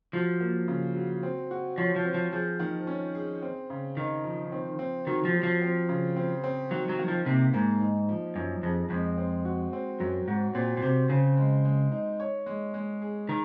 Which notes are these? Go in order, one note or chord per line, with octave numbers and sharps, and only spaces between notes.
F3 F#3
A#3
C#3
F#3
C4
F#4
F3 C#5
F3
C4
F3
F3 G#4
D#3
C#4
G#4
C4
C#3
D#3 D#4
F3
C4
C4
D#3 F#3
F3
F#3
F3
C4
C#3
C4
C4
D#3 F#3
F#3
D#3
F3
C3 A#3
G#2 A#3
D#4
F3
F#2 F3
F2 G#4
F2 G#3
C4
F#4
C4
F#2 F#3
G#2 F#4
A#2 C4
A#2
C3 C5
C#3 C4
G#3
G#3
D#4
C#5
G#3
G#3
G#4
D#3 A#4